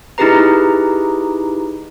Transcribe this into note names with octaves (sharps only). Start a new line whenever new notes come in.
D#4 E4 G4 G#4 B4 A#5